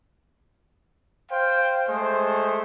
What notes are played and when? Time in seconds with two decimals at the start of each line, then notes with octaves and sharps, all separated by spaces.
1.31 C5 F5 G5
1.87 G#3 A3 C5